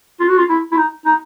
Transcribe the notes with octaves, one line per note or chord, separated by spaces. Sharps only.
F4
F#4
F4
E4
E4
D#4
D#4